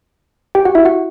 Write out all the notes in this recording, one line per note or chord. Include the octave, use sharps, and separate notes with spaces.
G4 G5
F#4 F#5
E4 E5
F#4 F#5